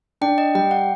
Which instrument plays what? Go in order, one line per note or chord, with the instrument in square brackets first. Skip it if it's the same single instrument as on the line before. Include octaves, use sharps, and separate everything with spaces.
[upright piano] D4 [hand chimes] G5
[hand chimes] D#5
[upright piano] G3 [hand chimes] G5
[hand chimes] F#5